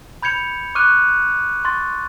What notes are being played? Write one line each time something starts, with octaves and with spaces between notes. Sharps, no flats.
B5 G6 G#6 C#7 F7
C#6 D6 F6 F#6 D#7
C6 C#6 A6